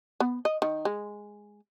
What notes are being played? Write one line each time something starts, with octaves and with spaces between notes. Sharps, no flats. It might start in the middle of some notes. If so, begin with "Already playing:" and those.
B3
D#5
D#3
G#3